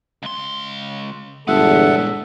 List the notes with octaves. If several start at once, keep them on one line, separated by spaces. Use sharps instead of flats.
C#2 C6
G1 E2 A#2 G#3 A4 E5 F#5